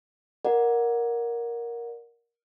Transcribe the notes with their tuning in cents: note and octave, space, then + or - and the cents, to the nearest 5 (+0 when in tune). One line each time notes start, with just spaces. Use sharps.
A#4 +10 D5 +0 F#5 -20